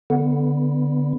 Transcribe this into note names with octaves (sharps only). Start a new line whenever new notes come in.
D3 B3